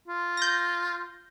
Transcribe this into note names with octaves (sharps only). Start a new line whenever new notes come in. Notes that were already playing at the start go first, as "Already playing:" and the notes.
F4
G6 A#6